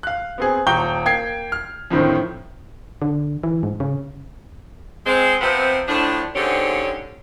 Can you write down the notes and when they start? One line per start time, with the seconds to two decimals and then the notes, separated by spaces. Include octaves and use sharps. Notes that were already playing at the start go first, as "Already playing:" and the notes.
0.03 F5 F#6
0.38 B3 C4 G#4
0.67 D#1 G5 A#5 C#6 G6 G7
1.05 A#3 G5 G#6 C7
1.52 F6
1.91 F2 A2 D3 D#3 C4
3.02 D3
3.43 E3
3.63 G#2
3.80 C#3
5.06 G#3 C4
5.40 C3 F3 B3 C4
5.87 A2 F3 D4
6.35 G#2 D3 C4 C#4 G4